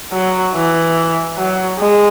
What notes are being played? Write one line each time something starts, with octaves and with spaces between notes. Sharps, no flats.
F#3
E3
F#3
G#3